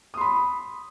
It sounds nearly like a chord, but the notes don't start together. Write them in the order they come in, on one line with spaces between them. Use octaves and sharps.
D#6 C6 B5